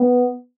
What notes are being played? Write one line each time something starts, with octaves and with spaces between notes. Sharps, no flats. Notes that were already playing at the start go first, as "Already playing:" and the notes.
Already playing: B3